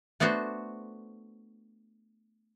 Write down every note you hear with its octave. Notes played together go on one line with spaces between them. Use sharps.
A3 B3 D4 F#4 C5